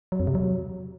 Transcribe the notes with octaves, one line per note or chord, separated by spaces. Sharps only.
F#3
F2
C3
F#3